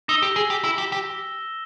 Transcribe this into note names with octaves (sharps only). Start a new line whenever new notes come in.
D#4 E6 A#6 E7 G7
G4
G#4
G4
E4
G4
G4